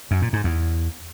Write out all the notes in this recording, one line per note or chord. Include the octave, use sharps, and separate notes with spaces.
F#2
A#2
G#2
E2